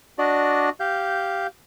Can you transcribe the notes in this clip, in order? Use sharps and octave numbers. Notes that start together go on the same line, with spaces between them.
D4 F#4 D5 D#5
G4 F5 G6